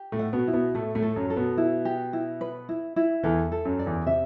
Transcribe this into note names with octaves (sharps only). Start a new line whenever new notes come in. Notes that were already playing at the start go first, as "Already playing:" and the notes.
Already playing: G4
A2 A3
F#5
B2 B3
E4
B2 B3
A2 A3 A4
A2 A3
A4
F#2 F#3
A4
B2 B3
E4
G4
E4
B4
E4
E4
E2 E3 A4
A4
F#2 F#3
D5
E2 E3
C3 E5